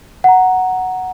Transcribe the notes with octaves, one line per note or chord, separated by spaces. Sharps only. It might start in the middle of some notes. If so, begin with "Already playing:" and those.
F#5 A#5